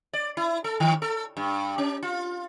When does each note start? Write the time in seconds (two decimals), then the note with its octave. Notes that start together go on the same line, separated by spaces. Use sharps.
0.13 D5
0.37 E4
0.64 A4
0.80 D#3
1.02 A4
1.37 G2
1.78 C#4
2.03 F4